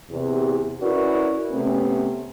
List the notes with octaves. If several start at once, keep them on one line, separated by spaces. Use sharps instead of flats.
E2 C3
C#4 E4 F#4 A#4 B4 D5
C3 A3 B3 C#4